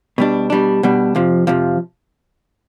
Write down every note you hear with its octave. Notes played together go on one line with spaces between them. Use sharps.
B2 G3 D4
B2 G3 D4
B2 G3 D4
F2 C3 F3
F2 C3 F3